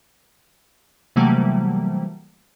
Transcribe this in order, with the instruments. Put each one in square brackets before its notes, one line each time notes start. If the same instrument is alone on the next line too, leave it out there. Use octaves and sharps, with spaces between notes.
[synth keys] C3 E3 F#3 G3 A3 A#3